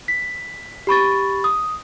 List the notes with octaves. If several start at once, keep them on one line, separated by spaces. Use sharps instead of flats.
B6
G4 B5 C#6 A6
D#6